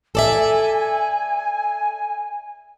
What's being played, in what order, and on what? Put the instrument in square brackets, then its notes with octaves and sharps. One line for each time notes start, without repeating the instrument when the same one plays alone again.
[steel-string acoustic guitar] A4 D5 E5 [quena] G#5